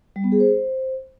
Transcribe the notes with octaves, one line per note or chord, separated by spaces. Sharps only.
G3
B3
G#4
C5